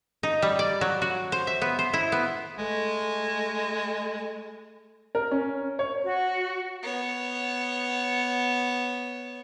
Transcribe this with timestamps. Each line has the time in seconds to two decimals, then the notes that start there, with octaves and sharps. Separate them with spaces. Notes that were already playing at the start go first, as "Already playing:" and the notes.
0.23 D#4
0.42 G3
0.59 D5
0.81 F#3
1.02 F#4
1.32 C5
1.47 E5
1.61 B3
1.79 C5
1.93 E4
2.12 B3
2.58 G#3 A3
5.15 A#4
5.31 C#4
5.79 C#5
6.03 F#4
6.83 B3 C#5